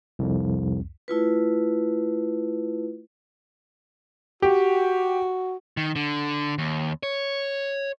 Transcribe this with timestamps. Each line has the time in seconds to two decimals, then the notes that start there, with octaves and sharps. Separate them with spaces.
0.19 C2 F2
1.08 A3 E4 F4 B4
4.42 F#4 G4
5.77 D#3
5.96 D3
6.58 D#2
7.03 C#5